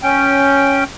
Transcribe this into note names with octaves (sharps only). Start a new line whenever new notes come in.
C#4 G5